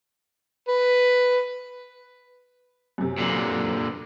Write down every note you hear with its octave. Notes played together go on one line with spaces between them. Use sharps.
B4
F#2 C3
A#2 D3